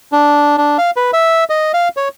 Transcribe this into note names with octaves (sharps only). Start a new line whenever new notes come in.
D4
D4
F5
B4
E5
D#5
F5
C#5